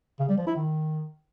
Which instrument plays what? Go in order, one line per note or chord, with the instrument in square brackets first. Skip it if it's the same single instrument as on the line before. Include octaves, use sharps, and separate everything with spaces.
[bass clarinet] C#3
G3
F3
E4
D#3